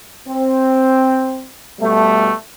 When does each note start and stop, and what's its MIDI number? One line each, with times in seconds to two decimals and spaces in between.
0.28 1.45 60
1.80 2.32 47
1.80 2.32 55
1.80 2.32 57